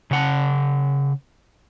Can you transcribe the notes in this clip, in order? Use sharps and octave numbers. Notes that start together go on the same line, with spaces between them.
C#3 F#5 A5